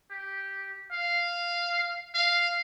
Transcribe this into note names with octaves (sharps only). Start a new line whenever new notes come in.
G4
F5
F5